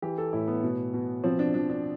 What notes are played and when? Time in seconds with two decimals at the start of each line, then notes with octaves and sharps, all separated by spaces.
0.02 E3 G4
0.18 A4
0.33 A2 E4
0.48 B3
0.63 B2
0.93 B2
1.24 F3 C4
1.39 D4
1.54 F3 D4
1.70 D4